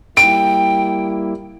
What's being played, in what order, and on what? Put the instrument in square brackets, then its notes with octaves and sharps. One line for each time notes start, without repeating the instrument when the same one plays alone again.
[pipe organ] G3 A#3 E4 [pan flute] G5 [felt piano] D7